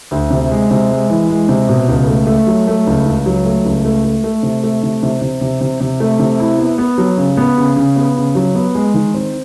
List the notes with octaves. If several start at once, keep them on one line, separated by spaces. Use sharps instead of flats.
D2
C3
G#3
C3
G#3
E3
G#3
C3
B2
C#2
A3
A3
F#3
A3
C#2
C#2
F#3
A3
C#2
A3
A3
A3
C3
A3
C3
C3
C3
C3
C3
C3
A3
C3
E4
B3
B3
F#3
C#3
B3
C#3
C#3
B3
C#3
F#3
B3
G#3
D#3
C4